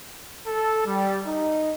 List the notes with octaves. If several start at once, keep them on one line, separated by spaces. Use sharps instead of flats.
A4
G3
D#4